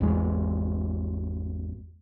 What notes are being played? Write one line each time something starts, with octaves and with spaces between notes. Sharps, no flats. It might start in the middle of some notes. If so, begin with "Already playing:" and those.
G#1 E2 G#3